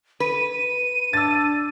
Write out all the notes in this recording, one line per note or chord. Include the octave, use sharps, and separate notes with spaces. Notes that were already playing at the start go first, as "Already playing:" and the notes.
B4 D#7
D4 E6 A6